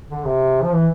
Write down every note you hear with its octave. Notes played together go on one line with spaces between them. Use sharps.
D3
C3
F3
E3